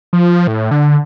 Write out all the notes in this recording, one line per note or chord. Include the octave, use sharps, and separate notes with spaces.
F3
A2
D3